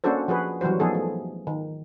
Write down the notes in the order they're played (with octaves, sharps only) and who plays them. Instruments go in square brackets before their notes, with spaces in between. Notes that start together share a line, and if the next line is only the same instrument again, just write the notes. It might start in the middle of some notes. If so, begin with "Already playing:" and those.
[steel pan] A#3 C#4 D4 F#4 A4 C5
F3 F#4 G#4 B4
E3 F#3 G3 F#4 C5
F3 B3 D#4 G#4 A4
A3
D#3